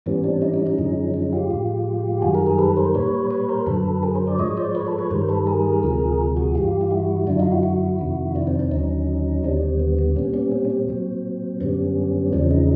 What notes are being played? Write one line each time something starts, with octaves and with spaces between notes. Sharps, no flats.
G#2 E3 G3 B3 C#4
C4 D4
C#4 D#4
C#4 D#4
C#4 D#4
F#2 D3 F3 G#3
C#4 D#4
F4 G4
A2 F3 G#3
F#2 D#3 G3 F#4 G#4
G#4 A#4
G#4 A#4
A4 B4
A#4 C5
A#2 G3 B4 C#5
B4 C#5
A#4 C5
F#2 D3 F#3 A4 B4
G#4 A#4
A#4 C5
C5 D5
G#2 F3 G#3 C#5 D#5
C5 D5
B4 C#5
A4 B4
B4 C#5
G2 D#3 G3 A#4 C5
A4 B4
G#4 A#4
D2 C3 F3 G#3
F#4 G#4
G2 E3 G3 F4 G4
F4
E4 F#4
F#2 D3 F#3 D4 E4
D#4 F4
E4 F#4
E4 F#4
F2 C3 D#3
D4 E4
C4 D4
C4 D4
D#2 D3 F#3 C#4 D#4
D#2 D3 G3 C4 D4
C4
B3
B3
A#2 G3 B3 C#4
B3 C#4
C4
C#4
C4
A#2 F#3
F#2 D3 G3 B3 C#4
E2 C#3 F3 G#3 C4 D4
C#4 D#4